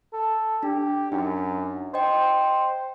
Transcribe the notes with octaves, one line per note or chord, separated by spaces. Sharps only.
A4
D4 G4
F#2 D4 D#4
C5 D#5 G5